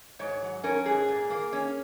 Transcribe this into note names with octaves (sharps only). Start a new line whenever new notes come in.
G#2 C#5
F#3
C#4 A#4
G#2 G#4
A#2
A#3
C#4